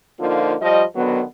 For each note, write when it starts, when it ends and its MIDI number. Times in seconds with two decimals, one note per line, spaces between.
0.20 0.55 50
0.20 0.55 53
0.20 0.55 58
0.20 0.55 63
0.20 0.55 65
0.61 0.83 53
0.61 0.83 55
0.61 0.83 75
0.95 1.22 50
0.95 1.22 51
0.95 1.22 54
0.95 1.22 59